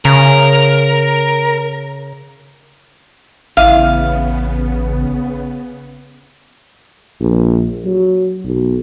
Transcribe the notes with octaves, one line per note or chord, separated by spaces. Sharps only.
C#3 A#4
A1 C#3 B3 E4 E5 F5
A#1
F#3
B1